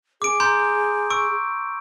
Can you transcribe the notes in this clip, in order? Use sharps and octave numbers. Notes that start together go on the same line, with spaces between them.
G#4 D6 D7
A#5 C6 G6
C#6 E6 D7